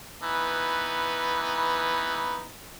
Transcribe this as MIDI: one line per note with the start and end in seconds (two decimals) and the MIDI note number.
0.22 2.49 52
0.22 2.49 59
0.22 2.49 63